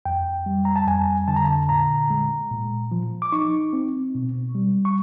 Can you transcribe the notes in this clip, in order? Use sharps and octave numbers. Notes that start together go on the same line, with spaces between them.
F2 G5
G3
A#5
A5
F2 G#5
D3 A5
A#5
A5
A#2 A#5
G#3
A#2
F3
D6
D#4 C#6
C4
B2
G3
C#6